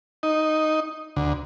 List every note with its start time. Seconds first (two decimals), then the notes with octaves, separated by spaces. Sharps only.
0.23 D#4
1.16 D2